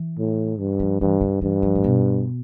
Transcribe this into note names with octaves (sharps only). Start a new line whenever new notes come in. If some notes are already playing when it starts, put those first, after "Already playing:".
Already playing: E3
A2
G2
F3
G2 E3
D3
G2 E3
F3
A2
B2